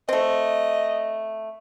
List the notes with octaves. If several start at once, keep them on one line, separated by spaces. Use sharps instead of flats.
A3 C4 D#5